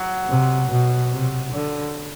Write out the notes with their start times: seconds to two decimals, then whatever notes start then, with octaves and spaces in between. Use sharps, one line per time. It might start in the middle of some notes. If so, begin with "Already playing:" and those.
Already playing: F#3
0.29 C3
0.70 B2
1.12 C3
1.53 D3